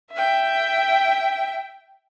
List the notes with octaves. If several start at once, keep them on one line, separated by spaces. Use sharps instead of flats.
E5 G5